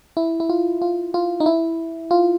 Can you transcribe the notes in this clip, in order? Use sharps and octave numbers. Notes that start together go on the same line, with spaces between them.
E4
E4
F4
F4
F4
D#4
E4
F4